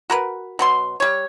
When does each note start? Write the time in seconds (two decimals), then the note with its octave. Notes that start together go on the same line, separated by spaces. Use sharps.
0.10 F#4 A#4 B4
0.59 B2 F#3 C6
1.00 G3 C#5